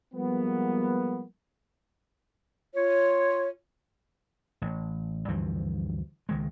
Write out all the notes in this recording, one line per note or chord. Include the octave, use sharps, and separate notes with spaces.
F3 G3 G#3 A#3 B3
F4 C#5
A1
D2 G2 E3 F3
C#2 D#3 G#3